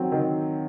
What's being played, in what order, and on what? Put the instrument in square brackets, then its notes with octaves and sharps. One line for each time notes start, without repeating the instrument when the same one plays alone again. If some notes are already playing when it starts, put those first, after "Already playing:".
Already playing: [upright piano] D#3 F#3 C4
D#3